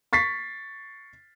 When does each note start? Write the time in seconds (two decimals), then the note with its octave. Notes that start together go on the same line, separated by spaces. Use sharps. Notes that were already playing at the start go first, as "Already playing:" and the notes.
0.13 C#6 A6 B6 C7